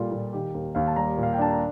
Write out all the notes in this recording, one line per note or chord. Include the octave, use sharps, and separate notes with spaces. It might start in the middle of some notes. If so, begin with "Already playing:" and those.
Already playing: A#2 G3 F4 A4
A#2 F4
D#3 G4
D#2 A#4
D#2 F5
A5
G3 A#5
A#2
F5
G5
D4 A5
A#5